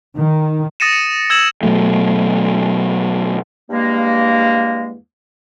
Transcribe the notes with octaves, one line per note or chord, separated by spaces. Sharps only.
D#3
D#6 A6 A#6 C#7 D#7 E7
C#7
E6 G#6 E7 F#7
B2 F#3 A3
E2 G2 G#3 A#3